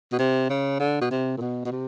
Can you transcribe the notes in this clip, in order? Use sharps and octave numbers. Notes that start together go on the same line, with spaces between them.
B2
C3
C#3
D3
B2
C3
A#2
B2
B2
C3